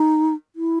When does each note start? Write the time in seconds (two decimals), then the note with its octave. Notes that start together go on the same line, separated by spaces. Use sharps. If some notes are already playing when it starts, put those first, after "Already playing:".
Already playing: D#4
0.56 E4